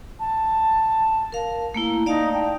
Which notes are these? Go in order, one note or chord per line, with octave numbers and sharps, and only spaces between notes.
A5
A#4 F5
A3 A#3 E4
D#4 D5 F5 A5
G5